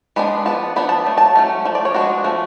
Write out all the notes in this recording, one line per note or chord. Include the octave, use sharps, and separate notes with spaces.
G#3 B3 D4 B5
F3 B3 A5
F3 B3 D4 B5
A5
F#3 A3
A5
F#3 A3 C#4
F3 A3
D5
C#5
F3 G#3 B3 D4 F#4
F3 A3 C#4